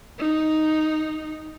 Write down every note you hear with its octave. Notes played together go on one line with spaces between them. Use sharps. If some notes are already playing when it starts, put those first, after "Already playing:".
D#4